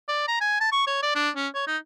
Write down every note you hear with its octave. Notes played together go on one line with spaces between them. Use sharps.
D5
A#5
G#5
A5
C#6
C#5
D5
D4
C#4
C#5
D#4